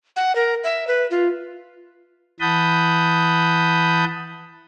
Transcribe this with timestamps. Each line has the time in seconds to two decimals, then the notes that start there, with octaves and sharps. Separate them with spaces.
0.16 F#5
0.36 A#4
0.64 E5
0.87 B4
1.11 F4
2.40 E3 F#5 A5 B5 D#6 G6